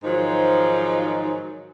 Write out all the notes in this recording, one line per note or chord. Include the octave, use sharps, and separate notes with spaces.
G#2 D#3 F3 F#3 D#4